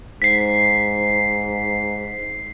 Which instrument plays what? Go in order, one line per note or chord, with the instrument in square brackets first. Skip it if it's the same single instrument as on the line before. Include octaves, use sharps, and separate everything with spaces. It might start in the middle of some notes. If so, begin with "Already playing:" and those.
[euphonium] G#2 [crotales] B6 C7